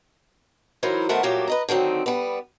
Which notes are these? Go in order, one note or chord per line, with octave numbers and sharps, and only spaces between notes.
E3 F#3 D#4 E4 A#4 C5
D#3 A3 B3 A#4 C5 F#5
A#2 F3 F#3 A3 A#3 G4
B4 D#5 A#5
D3 D#3 F#3 C4 D#4
G3 B3